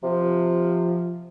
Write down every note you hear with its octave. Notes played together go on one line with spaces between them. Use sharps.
C3 F3